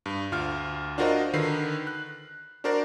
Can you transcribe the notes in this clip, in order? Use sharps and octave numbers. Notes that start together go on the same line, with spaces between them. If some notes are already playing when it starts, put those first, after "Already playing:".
G2
D2 F4 F6
D4 F4 F#4 A#4 C5 D#5
D3 D#3 B4 C7
F#6
D4 F#4 A#4 C5 D5